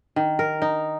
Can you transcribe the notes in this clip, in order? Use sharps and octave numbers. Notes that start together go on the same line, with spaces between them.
D#3
A#4
D#4